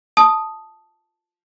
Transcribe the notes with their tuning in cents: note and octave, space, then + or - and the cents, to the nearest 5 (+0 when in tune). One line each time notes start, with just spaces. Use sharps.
A5 -5 D#6 +0